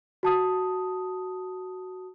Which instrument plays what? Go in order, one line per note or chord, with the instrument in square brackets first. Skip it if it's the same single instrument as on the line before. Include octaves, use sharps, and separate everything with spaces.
[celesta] F#4 A5 D#6